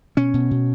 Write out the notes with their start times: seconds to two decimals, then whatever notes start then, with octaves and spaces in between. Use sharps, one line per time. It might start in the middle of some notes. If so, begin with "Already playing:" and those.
0.17 B2 C#4
0.34 B2
0.51 B2